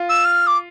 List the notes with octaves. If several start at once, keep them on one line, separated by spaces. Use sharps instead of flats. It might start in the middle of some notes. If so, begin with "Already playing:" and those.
Already playing: F4
E6
F6
D6